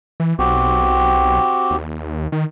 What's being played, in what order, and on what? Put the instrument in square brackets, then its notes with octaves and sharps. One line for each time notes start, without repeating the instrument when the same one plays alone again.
[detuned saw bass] E3
[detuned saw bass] B1 [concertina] C4 F#4 G4
[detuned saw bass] D#2
D#3